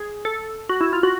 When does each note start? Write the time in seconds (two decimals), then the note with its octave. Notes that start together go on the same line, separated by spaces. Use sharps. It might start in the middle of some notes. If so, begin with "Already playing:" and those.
Already playing: G#4
0.25 A4
0.69 F#4
0.81 E4
0.93 F4
1.03 F#4